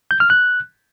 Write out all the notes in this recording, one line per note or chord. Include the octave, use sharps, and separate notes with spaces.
G6
F6
F#6